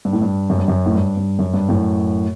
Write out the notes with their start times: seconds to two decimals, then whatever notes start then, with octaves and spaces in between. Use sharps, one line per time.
0.05 G2
0.13 A2
0.22 G2
0.50 F#2
0.59 G2
0.68 F#2
0.86 A2
0.95 G2
1.17 G2
1.39 F#2
1.54 G2
1.69 F#2 A2